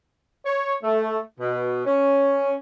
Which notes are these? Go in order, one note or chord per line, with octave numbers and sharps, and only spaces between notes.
C#5
A3
B2
C#4